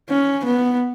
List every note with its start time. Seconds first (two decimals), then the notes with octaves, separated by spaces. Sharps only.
0.09 C#4
0.45 B3